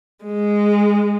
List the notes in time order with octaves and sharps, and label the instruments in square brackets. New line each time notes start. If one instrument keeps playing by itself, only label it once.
[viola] G#3